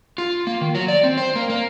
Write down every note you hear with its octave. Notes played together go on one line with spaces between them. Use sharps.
F4
A#3
D#3
F#3
D5
C4
C5
A#3
A#3